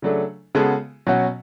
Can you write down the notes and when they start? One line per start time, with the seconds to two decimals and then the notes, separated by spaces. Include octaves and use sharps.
0.02 C#3 F#3 A3 D4 A4
0.55 C#3 G#3 B3 F#4 A4
1.07 B2 F#3 C#4 F#4